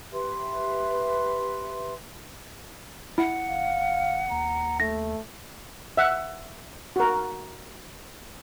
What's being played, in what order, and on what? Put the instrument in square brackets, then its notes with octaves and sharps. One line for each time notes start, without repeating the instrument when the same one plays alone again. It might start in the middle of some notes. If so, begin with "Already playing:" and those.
[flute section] G4 B4 E5 C6
[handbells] E4 [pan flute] F#5
[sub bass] G1 [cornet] F5
[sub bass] D#2 [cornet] A#5
[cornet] A3 [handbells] A#6
[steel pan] E5 F#5
F#4 A#4